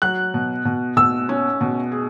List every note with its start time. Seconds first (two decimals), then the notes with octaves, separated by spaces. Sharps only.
0.02 F#3 F#6
0.34 B2
0.65 B2
0.96 B2 E6
1.29 C#4
1.61 B2
1.92 G#4